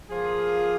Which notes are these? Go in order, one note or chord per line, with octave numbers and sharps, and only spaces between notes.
F3 A#3 F4 G#4